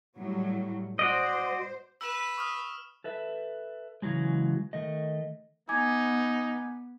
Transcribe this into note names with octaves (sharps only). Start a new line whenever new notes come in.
A2 F#3 G3
F#4 C5 D5 D#5
B4 E6 E7
C#6 D#6 F6
A4 B4 E5
C#3 E3 F#3 G#3
D#3 A3 D#5
B3 D#4 G#5 D6 G#6